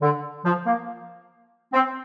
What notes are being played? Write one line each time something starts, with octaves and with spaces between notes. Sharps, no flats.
D3
F3
A#3
C4